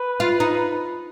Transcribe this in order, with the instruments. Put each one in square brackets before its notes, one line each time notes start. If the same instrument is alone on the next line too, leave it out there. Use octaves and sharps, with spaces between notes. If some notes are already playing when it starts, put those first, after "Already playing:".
Already playing: [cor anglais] B4
[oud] F4
D#4